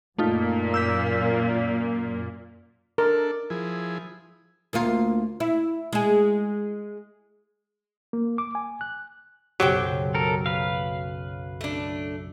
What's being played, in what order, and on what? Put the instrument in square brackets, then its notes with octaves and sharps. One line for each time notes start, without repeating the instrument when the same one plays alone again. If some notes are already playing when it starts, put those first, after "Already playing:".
[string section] F#2 A#2 A#3 [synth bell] A3 D#4 F4
[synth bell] E6 G6 B6
[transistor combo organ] D4 A4 [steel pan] A#4
[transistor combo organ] F3 E4 G#4
[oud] D2 A#3 F4
E4
G#3 G#4
[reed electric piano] A#3
D6
G#5
F#6
[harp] B1 F#2 C#3 [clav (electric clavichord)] F#3 [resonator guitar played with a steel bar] G4 C5 G5
[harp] C#4 [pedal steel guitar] A4 A#4
[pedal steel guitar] B4 F5
[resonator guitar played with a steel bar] A3 D4